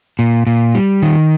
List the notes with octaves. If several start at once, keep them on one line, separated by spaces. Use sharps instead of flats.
A#2
A#2
G3
D#3